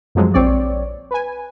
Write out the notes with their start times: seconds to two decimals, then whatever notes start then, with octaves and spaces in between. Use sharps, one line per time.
0.15 F#2 C3 F3 F#3 G#3
0.34 A#1 C4 C#5 D5
1.11 B4 G#5